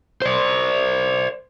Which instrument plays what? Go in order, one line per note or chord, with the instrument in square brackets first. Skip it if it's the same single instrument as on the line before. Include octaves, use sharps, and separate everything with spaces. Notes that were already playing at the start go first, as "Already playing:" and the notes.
[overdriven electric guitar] C5 D5